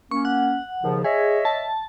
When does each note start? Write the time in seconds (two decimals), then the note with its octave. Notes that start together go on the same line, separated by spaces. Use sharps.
0.11 A#3 C#4 C#6
0.25 F#5
0.83 D#2 C#3 F3
1.04 G#4 C#5 D#5 E5
1.45 A5